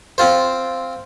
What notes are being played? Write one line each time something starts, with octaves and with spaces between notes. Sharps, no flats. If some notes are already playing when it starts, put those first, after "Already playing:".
C4 F4 C5